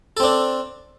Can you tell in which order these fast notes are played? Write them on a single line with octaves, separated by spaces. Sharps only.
A4 C4 D4